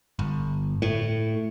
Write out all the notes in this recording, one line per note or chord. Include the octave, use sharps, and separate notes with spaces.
G1
A2